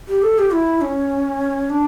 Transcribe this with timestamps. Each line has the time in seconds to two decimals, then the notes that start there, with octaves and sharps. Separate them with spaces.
0.08 G4
0.23 A4
0.38 G4
0.53 E4
0.81 C#4
1.70 D4